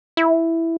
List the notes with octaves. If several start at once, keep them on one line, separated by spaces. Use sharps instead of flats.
E4